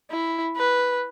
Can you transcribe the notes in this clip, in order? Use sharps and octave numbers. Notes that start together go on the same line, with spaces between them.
E4
B4